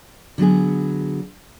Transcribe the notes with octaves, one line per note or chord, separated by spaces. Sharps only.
D3 F#3 B3 G#4